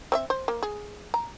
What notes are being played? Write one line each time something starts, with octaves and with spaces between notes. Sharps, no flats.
C4 C#5 E5
C5
A#3
G#4
A#5